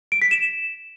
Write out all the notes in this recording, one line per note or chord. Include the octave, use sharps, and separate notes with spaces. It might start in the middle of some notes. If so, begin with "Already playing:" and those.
D7
B6
E7